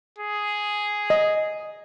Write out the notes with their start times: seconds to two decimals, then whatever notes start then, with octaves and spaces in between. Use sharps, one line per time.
0.19 G#4
1.10 D#5